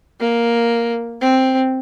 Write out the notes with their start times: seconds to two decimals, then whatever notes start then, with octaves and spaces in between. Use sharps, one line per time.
0.20 A#3
1.21 C4